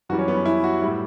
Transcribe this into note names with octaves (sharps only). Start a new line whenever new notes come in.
F#2 E3 G3 F#4
C#4
B3
C#4
E4
F#4
A2 G3 E4